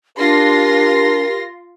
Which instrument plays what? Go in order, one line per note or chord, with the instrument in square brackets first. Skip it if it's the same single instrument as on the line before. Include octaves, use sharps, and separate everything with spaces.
[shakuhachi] D4 [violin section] F4 C6 A#6 [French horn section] G4 A#4